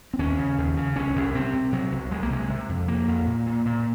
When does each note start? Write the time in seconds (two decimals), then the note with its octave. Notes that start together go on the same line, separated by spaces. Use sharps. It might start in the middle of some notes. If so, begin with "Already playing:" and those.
0.13 C4
0.19 D#2 C#4
0.39 C#3
0.58 D#2
0.77 C#3
0.96 C2 C#4
1.16 C2
1.35 C3 C4
1.54 C3
1.72 C3 F#3
1.92 C2
2.11 C2 G#3
2.23 A#3
2.30 C3 G#3
2.50 C3
2.69 F2
2.87 F2 A#3
3.07 F2
3.26 A#2
3.46 A#2
3.65 A#2